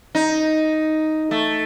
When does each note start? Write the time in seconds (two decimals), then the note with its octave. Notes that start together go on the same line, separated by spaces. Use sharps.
0.15 D#4
1.31 A3